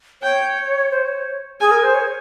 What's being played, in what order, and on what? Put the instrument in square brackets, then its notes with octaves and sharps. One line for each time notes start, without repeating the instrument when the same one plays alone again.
[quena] C#5 [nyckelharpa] G5
[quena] C5
C#5
[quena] G#4 [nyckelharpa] G#5
[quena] A#4
C5
C#5